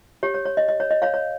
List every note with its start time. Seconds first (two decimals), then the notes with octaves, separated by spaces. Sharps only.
0.23 G4 C#5
0.34 C#5
0.46 C#5
0.57 D#5
0.69 D#5
0.80 C#5
0.91 D#5
1.02 C#5 F5
1.14 C#5